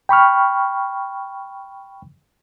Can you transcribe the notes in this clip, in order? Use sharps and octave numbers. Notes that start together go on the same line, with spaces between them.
G5 B5 C#6 F6